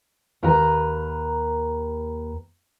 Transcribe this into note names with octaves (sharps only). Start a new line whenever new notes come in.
D#2 A#4 B4 A#5